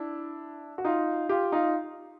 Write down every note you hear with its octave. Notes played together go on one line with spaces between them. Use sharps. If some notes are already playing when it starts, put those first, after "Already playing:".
Already playing: D4 E4
F#4
D#4 F4
F4 G4
D#4 F4